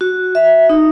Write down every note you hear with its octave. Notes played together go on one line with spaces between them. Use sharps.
F#4
E5
D#4